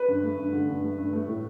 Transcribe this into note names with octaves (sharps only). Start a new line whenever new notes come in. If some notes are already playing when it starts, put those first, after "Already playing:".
Already playing: B4
G2
A3
G2
D3
G2
A3
G2
A3
A2